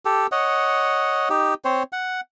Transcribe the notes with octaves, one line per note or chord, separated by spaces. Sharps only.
G4 A4
C#5 D#5 F#5
D#4 G4
C4 C5 C#5
F#5